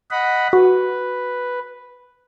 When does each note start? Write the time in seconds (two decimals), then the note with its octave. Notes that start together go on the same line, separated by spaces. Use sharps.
0.11 D#5 F#5 B5
0.53 F#4 B4